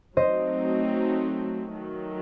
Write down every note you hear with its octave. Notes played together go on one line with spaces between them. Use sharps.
F#3 A3 C4 D#4 C5 D#5
D#3 F#3 A3